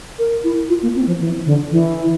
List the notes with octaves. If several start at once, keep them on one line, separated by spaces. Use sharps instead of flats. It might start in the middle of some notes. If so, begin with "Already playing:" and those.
A#4
E4
F4
A#3
C4
F3
E3
D3
E3